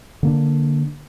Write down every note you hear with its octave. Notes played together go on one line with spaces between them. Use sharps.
D3 A#3 D4